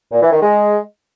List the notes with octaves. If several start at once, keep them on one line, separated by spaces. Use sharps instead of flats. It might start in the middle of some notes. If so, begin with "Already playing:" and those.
A#2
E3
D#3
G#3